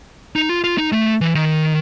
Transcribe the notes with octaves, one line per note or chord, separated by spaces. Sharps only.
D#4
F4
F4
D#4
A3
E3
D#3